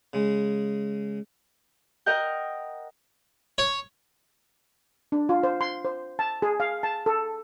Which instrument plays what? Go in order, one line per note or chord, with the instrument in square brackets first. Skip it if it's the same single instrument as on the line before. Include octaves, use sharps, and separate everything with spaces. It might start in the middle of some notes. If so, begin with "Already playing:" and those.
[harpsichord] C#3 G#3
[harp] A#4 D#5 F#5 G5 G6
[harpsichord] C#5
[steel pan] D4
F4
C5
C6
C5
A5
G#4
F5
A5
A4